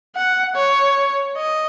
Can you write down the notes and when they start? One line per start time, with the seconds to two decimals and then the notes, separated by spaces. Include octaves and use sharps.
0.16 F#5
0.56 C#5
1.37 D#5